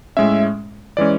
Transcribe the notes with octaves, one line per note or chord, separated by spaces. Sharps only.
A2 G#3 C#4 E5
E3 G#3 C#4 D5